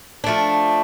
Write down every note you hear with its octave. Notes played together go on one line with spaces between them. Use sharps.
F3 A3 D4